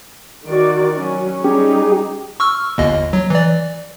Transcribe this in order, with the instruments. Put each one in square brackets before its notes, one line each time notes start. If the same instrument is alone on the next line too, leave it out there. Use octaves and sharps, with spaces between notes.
[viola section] D#3 F#4 D5
F#3 C#4
[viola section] G3 D#4 G#4 [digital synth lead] C#4 [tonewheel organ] G4
[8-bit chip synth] C#6 E6 F6
G1 D#2 D#5
F#3
E3 D5